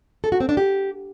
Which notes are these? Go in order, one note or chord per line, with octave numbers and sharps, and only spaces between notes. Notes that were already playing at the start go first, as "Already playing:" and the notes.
A4
F#4
C4
D4
G4